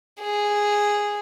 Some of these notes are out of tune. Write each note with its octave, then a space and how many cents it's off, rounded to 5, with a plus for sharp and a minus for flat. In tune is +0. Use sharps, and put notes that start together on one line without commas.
G#4 -5